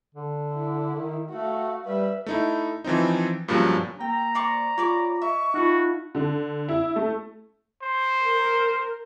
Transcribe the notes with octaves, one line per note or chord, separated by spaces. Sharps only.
D3
E4
D#3
A3 F#4 F5
G3 B4 E5
A3 D#4 E4
E3 F3 C4 D#4
G2 A#2 C#3 F3 F#3
A#3 G5 A#5
C5 D5 C#6
F4 C#5 D5 D6
D#5 E5 C#6
D#4 F4 F#4
D3
E4
A3
C5
A#4